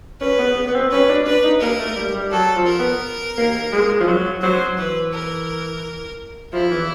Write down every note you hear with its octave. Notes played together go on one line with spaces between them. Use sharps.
C#4 B4
B3
B3
B3
C4
C#4 B4
D4
D4 B4
D#4
A#3 A#4
A3
G3
G3
F#3 A4
F3
A#4
B3
A#3
G#3
F3
F#3
F#3 C5
E3 B4
A#4
F3 E4
E3